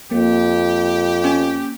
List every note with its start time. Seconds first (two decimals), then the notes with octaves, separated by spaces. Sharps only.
0.11 F2 A#3 G4
1.24 C#4